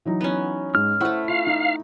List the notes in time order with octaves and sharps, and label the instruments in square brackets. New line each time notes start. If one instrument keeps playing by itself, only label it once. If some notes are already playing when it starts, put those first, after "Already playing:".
[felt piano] E3 F#3 D#4
[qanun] B3 C#4
[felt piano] G#2 [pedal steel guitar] F6
[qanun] A3 E4 [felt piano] C5 F#5 C#6
[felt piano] F4 [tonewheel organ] F5
[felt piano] D#4